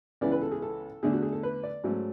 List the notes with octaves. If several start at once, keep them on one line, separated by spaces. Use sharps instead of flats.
C#2 C#3 E3 B3 E4 D5
B4
A4
G#4
A4
E2 D3 A3 D4 G#4
F#4
G#4
A4
B4
D5
G#2 F#3 A3 C#4